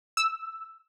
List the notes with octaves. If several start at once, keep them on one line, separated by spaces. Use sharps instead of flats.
E6